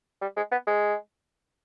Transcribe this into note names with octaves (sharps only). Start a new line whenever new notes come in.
G3
G#3
B3
G#3